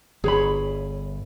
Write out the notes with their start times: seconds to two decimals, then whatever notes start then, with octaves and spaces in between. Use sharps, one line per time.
0.24 G1 G#4 C#5 B5